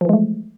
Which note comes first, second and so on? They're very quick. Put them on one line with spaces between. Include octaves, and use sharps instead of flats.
F3 E3 G#3 A3